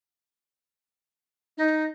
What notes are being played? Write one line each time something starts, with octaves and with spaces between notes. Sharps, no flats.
D#4